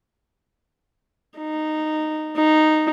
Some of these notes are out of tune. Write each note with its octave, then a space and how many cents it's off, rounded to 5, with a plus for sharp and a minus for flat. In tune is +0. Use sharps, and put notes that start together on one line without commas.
D#4 -10
D#4 -10